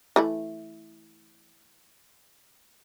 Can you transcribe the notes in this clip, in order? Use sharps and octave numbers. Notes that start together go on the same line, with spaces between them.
E3 A3 E4